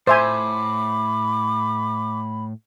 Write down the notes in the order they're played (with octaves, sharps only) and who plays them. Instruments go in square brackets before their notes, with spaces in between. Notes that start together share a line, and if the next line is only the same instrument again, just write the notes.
[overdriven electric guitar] A2 [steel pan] C5 E5 G#5 [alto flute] B5 [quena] D6